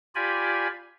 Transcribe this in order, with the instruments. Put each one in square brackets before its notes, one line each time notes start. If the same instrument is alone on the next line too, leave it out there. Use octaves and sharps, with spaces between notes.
[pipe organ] F4 G4 D5 G#5 B5